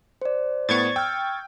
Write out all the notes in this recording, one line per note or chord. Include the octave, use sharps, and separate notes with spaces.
C5 D5
A2 B3 C#6 G#6 A6
G5 E6 F6